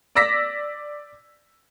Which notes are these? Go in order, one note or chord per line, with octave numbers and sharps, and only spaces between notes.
D5 D6 E6 A#6 B6